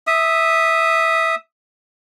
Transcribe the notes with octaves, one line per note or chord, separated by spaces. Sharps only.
E5 D#6